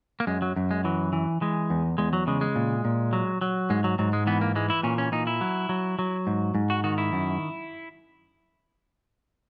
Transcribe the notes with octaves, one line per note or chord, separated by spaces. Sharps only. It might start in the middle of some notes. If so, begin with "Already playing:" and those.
A#3
F#2 G#3
F#3
F#2
G#3
E3 F#3
E3
E3 G#3
E2
E2 G#3
F#3
C#3 G#3
G#3
A#2
A#2
F#3
F#3
G#2 G#3
F#3
G#2 F#3
G#3
E3 B3
A#3
E3 G#3
E4
A#2 C#4
C#4
A#2 D#4
E4
F#3
F#3
F#3
G#2
G#2
F#4
D#3 F#4
E4
F#2